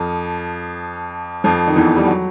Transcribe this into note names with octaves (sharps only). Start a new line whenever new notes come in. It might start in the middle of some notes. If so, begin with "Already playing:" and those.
Already playing: F2 F3
F2 F3
D#3
E2 E3
G3
F#3